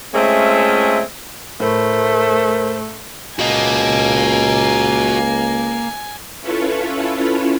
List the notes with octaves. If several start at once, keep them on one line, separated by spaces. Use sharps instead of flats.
G#3 A3 C4 C#4 F4 E5
A2 A3 A#4 C5
C#2 A#3 F#4 D#5 G#5
C#4 E4 F4 A4 B4 C#5